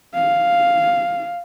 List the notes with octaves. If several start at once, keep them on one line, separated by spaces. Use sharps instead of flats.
F5